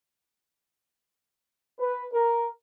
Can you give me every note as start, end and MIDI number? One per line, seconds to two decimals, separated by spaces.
1.79 2.03 71
2.12 2.45 70